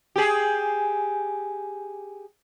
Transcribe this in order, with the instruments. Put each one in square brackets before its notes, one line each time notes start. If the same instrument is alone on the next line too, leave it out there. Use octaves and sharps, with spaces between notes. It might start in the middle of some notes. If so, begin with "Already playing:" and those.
[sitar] G4 G#4